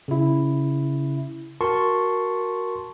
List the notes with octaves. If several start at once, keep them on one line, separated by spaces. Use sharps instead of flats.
C#3 E4
F#4 A#4 A5 C6 C#6